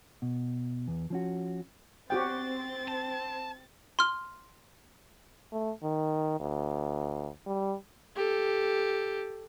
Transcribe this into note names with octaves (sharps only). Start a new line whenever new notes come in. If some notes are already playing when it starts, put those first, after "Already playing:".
B2
E2
F3 C#4 F#4
C4 F#4 G4 G5 A6
A5
C6 F6
A3
D#3
D2
G3
G4 A4